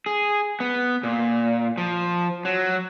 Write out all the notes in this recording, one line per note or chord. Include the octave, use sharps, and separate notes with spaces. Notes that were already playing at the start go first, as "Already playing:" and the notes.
G#4
B3
A#2
F3
F#3